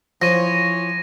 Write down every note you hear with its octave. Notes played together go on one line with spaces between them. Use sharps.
E3 F3 C#5 A#6 D#7